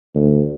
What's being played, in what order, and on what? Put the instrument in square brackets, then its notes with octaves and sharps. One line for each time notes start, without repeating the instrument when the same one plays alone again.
[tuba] D2